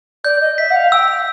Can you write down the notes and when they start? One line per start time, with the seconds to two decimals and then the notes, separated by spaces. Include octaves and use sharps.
0.24 D5 G6
0.41 D#5
0.58 E5 B6
0.70 F#5
0.75 F5
0.92 G5 E6